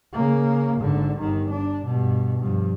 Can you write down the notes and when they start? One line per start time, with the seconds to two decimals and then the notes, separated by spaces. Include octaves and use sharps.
0.13 C#3 A#3
0.78 G#1 D3
1.19 G1 D#3
1.51 D4
1.86 G2 B2
2.39 G2 F3